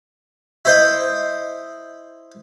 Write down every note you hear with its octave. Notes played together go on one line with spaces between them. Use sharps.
E4 C5 D#5